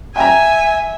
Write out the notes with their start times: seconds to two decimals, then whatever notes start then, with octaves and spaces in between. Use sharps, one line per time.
0.16 E5 G5 G#5 A#5